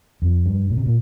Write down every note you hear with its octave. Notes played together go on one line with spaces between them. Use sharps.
F2
G2
A#2
C3
A#2